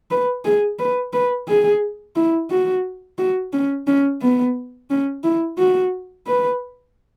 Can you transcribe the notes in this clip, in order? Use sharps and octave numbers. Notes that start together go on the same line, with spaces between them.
B4
G#4
B4
B4
G#4
E4
F#4
F#4
C#4
C#4
B3
C#4
E4
F#4
B4